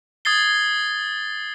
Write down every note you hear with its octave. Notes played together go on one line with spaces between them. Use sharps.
D#6 G#6 A6 C7 G7